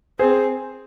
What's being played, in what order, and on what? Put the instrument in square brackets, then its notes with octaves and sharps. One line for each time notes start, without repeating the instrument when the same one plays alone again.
[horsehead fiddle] C4 [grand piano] G#4 C5